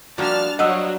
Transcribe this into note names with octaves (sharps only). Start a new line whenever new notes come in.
F3 G3 A#3 D4 F#4 A5 F6
F#3 B4 C5 D#5 F5 F#5 E6